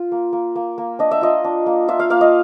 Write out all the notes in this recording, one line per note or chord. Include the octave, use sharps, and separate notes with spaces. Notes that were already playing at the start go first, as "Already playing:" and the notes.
Already playing: F4
A#3
A#3
A#3
A#3
D4 D#5
E5
F4 D#5
D4
A#3
F4 E5
F5
A#3 F5
D#5